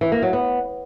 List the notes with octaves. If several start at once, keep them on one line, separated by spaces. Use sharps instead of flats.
E3
A#3
F#3
B3